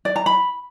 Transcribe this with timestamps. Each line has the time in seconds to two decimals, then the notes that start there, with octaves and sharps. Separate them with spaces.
0.05 D5
0.16 A#5
0.26 B5